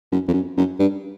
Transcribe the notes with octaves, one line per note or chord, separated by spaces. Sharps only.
F#2
F2
F#2
F#2
G2